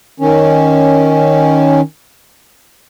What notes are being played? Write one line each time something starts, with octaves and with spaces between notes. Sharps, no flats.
D#3 C#4